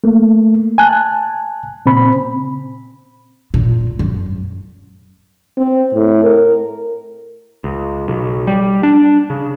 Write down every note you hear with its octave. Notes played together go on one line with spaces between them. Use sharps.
A3 A#3
G#5 A5 F#6
A#2 C#3 C4 B5
A#2
F#2
C4
A2
A#4
C#2
B1
G3
D4
C#3